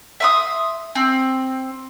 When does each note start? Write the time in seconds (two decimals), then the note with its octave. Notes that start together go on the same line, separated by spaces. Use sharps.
0.20 E5 C6 D#6
0.95 C4